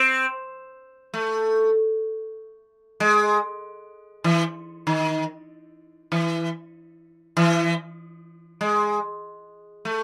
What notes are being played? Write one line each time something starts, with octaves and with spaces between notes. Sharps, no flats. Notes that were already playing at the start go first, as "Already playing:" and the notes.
Already playing: C4
A3
G#3
E3
D#3
E3
E3
G#3
A3